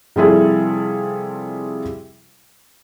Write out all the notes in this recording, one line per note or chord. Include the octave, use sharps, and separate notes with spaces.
C3 F3 G3 E4 G#4 A4